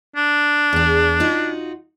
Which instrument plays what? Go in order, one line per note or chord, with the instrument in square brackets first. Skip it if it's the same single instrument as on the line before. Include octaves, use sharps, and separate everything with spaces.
[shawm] D4
[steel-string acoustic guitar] E2 G#4
D#4 F4 F#4